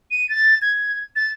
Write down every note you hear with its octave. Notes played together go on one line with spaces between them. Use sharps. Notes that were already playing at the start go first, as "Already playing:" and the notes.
D#7
A6
G#6
A6